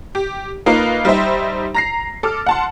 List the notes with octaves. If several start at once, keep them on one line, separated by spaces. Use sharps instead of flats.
G4
A#3 D#4 F4 B4
G3 D#4 C5 E5
A#5 A#6 C7
A4 D6 F6
F#5 A5 C6